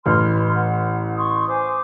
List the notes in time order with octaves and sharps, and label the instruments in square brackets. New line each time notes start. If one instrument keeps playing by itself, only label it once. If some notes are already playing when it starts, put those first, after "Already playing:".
[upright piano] A1 [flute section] B4 C6 F6
[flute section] F#5
C6 C#6 D#6
C5 G#5 D6